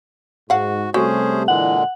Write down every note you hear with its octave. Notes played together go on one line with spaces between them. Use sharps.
G#2 F#4 F5 F#5
C3 G3 A3 C#4 F#4 G#4 C5
A#2 D3 E3 G#3 F#5